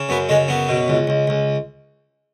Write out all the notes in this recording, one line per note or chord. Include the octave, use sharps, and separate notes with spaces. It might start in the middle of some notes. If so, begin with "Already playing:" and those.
Already playing: C#3
F#2 B3
C#3 G#3
F#2 B3
B2
C#2
C#2
C#2